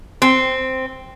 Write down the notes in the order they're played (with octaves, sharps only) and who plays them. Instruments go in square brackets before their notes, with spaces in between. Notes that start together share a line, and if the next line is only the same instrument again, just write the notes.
[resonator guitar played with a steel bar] C4